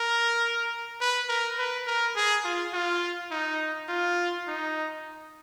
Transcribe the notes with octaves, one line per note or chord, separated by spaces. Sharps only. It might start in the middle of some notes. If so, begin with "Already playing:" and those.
Already playing: A#4
B4
A#4
B4
A#4
G#4
F4
F4
D#4
F4
D#4